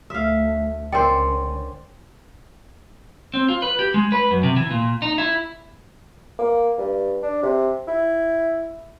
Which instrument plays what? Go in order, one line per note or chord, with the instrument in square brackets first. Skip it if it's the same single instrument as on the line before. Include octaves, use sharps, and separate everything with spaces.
[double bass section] D2 A3 [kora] E5 F5
[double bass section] C#2 D3 C#4 [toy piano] A#4 G5 [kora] C5 D5
[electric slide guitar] C4
F4
B4
G4
G#3
B4
F#2
C3
E3
A#2
D#4
E4
[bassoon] A#3
G2
D4
C3
E4